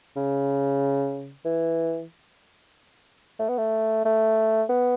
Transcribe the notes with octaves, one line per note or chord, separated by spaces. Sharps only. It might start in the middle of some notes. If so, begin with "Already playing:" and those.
C#3
E3
A3
B3
A3
A3
B3